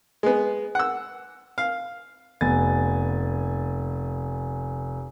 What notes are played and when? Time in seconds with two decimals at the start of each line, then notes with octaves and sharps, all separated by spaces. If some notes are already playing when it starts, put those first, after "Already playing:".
0.23 G#3 B3
0.75 F#5 E6
1.58 F5
2.41 F1 B3 G#5 A6